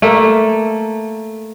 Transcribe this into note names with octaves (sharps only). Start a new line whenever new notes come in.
A3 A#3